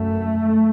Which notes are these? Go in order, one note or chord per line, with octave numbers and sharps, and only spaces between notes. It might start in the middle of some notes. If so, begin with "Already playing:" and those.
Already playing: F#2 A3